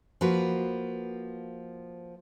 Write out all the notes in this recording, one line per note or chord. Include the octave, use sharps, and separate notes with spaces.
F3 A#3 F#4 B4